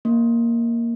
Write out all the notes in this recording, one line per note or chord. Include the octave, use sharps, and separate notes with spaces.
A#3